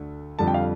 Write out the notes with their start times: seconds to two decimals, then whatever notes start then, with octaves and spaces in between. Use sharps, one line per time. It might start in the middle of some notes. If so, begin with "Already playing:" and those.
Already playing: D2 D3 A3
0.39 F2 D3 G3 A5
0.48 G5
0.54 F5